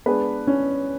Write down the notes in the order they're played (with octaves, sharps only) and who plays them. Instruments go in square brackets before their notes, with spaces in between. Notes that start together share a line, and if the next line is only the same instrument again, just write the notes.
[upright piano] G#3 D4 G#4 B4 [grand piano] B3
[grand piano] C#4